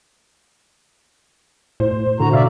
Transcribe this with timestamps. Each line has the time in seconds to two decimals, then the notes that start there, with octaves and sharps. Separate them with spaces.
1.80 A2 C5
2.20 A2 D3 F#4 A#5
2.33 B2 D5 E5 F5